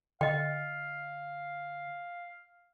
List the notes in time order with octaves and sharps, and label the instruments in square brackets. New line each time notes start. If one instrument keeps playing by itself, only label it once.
[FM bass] D3 [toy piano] D#5 G5 [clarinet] F5